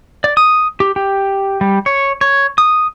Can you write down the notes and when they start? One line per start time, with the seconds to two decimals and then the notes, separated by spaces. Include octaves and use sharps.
0.24 D5
0.37 D#6
0.80 G4
0.96 G4
1.61 G3
1.86 C#5
2.21 C#5
2.58 D#6